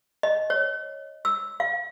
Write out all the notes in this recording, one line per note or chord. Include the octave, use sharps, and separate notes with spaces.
D#5
C#5
E6
F5